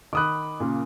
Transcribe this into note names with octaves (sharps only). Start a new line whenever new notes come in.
D#3 B5 D6 D#6 F#6
A#2 C#3 A#4